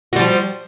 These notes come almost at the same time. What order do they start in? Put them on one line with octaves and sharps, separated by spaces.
F#4 G3 F3